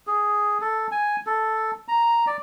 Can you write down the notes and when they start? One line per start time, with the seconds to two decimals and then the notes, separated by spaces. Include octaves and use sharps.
0.07 G#4
0.61 A4
0.92 G#5
1.27 A4
1.88 A#5
2.27 D5